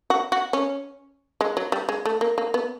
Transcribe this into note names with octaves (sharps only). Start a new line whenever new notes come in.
F#4
F#4
C#4
G#3
F#3
G3
G#3
A3
A#3
A#3
B3